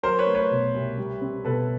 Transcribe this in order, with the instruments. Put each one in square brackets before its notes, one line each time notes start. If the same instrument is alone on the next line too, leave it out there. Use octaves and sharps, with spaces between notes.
[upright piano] F#3 [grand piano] A#4 C5
[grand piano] B4 C#5
[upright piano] A3
[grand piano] B4 C#5
[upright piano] B2
C2
G3
C4
[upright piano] B2 [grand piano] A4 B4